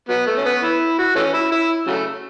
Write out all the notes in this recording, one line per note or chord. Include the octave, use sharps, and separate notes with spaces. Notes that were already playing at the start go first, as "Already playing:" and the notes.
F#3 B3
A3
C#4
B3
E4
F#4
E3 A3 C#4
E4
E4
C#3 F#3 A3